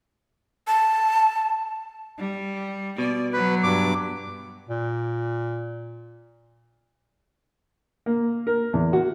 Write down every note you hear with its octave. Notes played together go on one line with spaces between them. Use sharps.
A5
G3
B2 D5
F#3 B4
G2 D6
A#2
A#3
A#4
E2
F#4